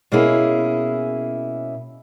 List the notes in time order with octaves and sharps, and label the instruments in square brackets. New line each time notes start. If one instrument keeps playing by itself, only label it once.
[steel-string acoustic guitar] B2 A#3 C#4 E4 G#4